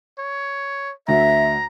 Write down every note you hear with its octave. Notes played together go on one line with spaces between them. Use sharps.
C#5
D2 D3 E5 A#5